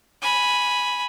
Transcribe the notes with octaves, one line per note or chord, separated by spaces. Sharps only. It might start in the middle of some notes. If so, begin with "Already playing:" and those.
G#5 B5